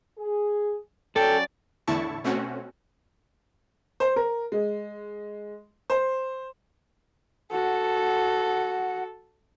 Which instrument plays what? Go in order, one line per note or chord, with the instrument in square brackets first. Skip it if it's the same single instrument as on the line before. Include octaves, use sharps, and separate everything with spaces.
[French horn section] G#4
[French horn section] F#3 C#4 [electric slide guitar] A4 [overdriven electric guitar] D5 [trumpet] G5
[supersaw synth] E2 A2 D3 E4 A5 C#6
B2 A3 C4 C#4 F#4
[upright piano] C5
A#4
G#3
C5
[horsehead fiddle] F#4 [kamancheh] A4 [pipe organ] F#5